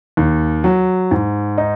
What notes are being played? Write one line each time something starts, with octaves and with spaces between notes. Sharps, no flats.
D#2
F#3
G#2
D#4